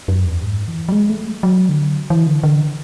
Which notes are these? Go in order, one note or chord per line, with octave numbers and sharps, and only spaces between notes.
F#2
E2
G#2
E3
F#3
G#3
A3
F#3
D3
E3
D3
D3